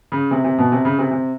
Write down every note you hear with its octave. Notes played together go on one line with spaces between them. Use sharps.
C#3
C3
C3
B2
C3
C#3
C3
C3